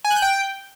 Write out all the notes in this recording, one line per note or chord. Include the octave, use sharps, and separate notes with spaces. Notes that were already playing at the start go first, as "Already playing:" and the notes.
G#5
F#6
G6
G5